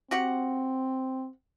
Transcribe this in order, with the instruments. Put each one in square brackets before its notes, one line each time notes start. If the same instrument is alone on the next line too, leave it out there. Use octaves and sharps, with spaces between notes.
[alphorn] C4 [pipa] F#4 G4 F#5